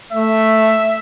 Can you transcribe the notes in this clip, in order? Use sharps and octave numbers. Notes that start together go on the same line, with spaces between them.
A3 E5